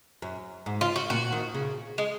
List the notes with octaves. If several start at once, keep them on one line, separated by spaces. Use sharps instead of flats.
F#2
G#2
F4
F#4
A#2 F#4
D#3
C#3
G#3